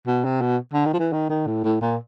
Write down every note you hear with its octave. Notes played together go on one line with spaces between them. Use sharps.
B2
C3
B2
D3
D#3
F3
E3
D#3
D#3
A2
A2
A#2